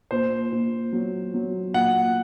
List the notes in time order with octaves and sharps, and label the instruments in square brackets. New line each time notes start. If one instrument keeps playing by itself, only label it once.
[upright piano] A#2 [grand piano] C5
[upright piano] A#2
F#3
F#3
[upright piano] A#2 [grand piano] F#5